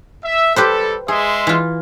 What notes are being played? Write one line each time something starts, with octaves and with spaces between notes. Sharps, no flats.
E5
G3 G4 A4 B4 C5
G#3 G#4 E5 C6
E3 F4